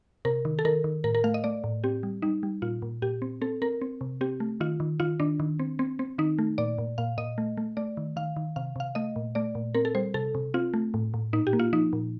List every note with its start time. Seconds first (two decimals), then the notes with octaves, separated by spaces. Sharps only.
0.25 C3 A#4
0.45 D#3
0.59 A4
0.65 D#3 A#4
0.84 D#3
1.04 A2 A#4
1.15 A#4
1.24 A3 F5
1.34 D#5
1.44 A3 D5
1.64 A2
1.84 C4 G4
2.03 G3
2.22 G3 D#4
2.43 G3
2.62 A#2 F4
2.82 A#2
3.02 A#2 G4
3.22 C4
3.41 C4 A4
3.62 C4 A#4
3.81 C4
4.01 C3
4.21 C4 G4
4.40 A3
4.60 D#3 F4
4.80 D#3
5.00 D#3 F4
5.20 D#3 D4
5.40 D#3
5.59 C4
5.79 C4
5.99 C4
6.18 D#3 D#4
6.39 A3
6.58 A#2 D5
6.78 A#2
6.98 A#2 F5
7.18 A#2 D#5
7.38 A3
7.57 A3
7.77 A3 D5
7.97 D#3
8.16 D#3 F5
8.36 D#3
8.56 C3 F5
8.76 C3 F5
8.95 A3 D#5
9.16 A#2
9.35 A3 D5
9.55 A#2
9.75 C4 A#4
9.85 A4
9.95 G3 C5
10.14 C3 A4
10.35 C3
10.54 C4 F4
10.74 A3
10.94 A2
11.14 A2
11.33 A#2 D#4
11.47 G4
11.53 A#3
11.59 F4
11.73 F3 D#4
11.93 A#2